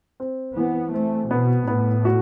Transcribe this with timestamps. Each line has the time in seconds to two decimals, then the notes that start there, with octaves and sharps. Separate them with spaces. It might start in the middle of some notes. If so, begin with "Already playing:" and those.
0.20 C4
0.56 E3 B3
0.94 A3 C4
1.31 B2 B3
1.67 A2 B3
2.05 F#4